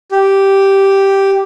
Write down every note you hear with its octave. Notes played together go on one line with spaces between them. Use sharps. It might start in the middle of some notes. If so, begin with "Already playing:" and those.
G4